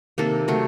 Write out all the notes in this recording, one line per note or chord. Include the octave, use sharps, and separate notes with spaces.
C3 D#3 A#3 A4
C3 F#3 A3